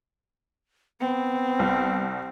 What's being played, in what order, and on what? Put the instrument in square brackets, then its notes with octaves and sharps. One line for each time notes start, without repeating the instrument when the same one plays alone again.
[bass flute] B3 [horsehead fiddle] C4
[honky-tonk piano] C2